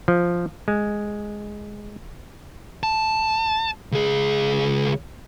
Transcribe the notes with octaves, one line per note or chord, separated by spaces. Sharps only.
F3
G#3
A5
C#2 G#4